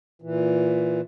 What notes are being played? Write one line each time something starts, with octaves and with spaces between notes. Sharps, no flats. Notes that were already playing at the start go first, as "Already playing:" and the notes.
A#2 E3